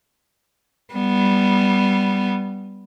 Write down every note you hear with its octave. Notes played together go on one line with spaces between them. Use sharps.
G3 B3